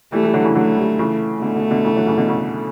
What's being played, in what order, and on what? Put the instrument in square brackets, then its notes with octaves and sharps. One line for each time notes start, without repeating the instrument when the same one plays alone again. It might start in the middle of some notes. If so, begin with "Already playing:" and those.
[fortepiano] E3 G3 [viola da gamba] A3
[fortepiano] E3 G3
D3 F#3
C#3 E3
[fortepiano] D3 F#3 [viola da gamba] A3
[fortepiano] E3 G3
C#3 E3
[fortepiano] B2 D3 [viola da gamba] A3
[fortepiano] B2 D3
B2 D3
C#3 E3
D3 F#3
C#3 E3
B2 D3
C#3